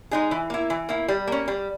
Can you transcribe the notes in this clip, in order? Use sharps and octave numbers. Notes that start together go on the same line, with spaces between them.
G#3 D#4 G#4
E3
A#3 E4
E3
A#3 E4
G3
A#3 C#4
G3